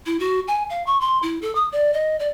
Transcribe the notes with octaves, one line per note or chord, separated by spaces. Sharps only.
E4
F#4
G#5
F5
C#6
C6
E4
A4
D#6
D5
D#5
D5